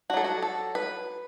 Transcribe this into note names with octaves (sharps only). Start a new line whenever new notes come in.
F#3 D4 F#4 A4
F#4
A4
B4